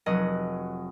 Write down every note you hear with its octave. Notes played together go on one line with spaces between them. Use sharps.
F1 F#3 D#5 F#5